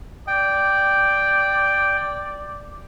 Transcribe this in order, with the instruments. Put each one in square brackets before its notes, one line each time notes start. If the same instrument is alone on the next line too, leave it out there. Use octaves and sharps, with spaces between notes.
[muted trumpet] D5 [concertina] G5